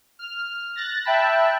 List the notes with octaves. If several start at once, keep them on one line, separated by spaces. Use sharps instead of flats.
F6
F#6 A6 A#6
E5 G5 A5 B5 F#6